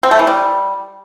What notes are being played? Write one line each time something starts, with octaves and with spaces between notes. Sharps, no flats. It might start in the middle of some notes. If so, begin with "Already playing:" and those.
C4
A3
E3
G3